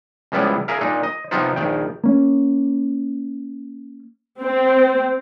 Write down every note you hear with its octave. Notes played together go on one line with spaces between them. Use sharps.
C#2 F3 G3 B3 E4 D5
G#4 A#4 E5 F5
A#2 D4 D#4
D#5
C3 F3 B3 D#4 F4 C5
A#1 D#3 G5
A#3 C#4
C4